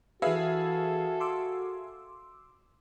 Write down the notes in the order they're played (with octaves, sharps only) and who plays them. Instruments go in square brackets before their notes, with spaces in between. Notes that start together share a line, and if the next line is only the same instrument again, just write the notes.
[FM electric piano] E3 B4 [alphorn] F#4 [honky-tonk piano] G#4 E5 F5 [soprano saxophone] A4
[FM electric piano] C6 D6 E6